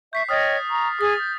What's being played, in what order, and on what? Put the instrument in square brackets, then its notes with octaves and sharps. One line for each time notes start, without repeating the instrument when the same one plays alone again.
[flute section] E5 C#6 [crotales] G6 B6 C7
[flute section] C#5 D#5 G5 [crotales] D#6 F6 A6
[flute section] A#5 C#6
[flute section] G#4 [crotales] D#6 A6
[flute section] G6